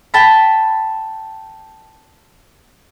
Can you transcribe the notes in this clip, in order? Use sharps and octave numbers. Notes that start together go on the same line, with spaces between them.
G5 A5 B5